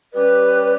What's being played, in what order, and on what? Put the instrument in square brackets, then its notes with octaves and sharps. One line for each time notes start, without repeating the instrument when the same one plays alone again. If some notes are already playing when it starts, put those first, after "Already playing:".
[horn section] G3 C#4 G4 D5 [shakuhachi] B4